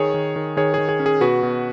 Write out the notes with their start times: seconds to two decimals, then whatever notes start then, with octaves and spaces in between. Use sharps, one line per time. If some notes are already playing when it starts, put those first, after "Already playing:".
Already playing: D#3 G#4 C#5
0.14 D#3
0.36 D#3
0.57 D#3 G#4 C#5
0.74 D#3 G#4
0.89 G#4
0.99 C#4
1.06 G#4
1.21 B2 F#4 B4
1.43 B2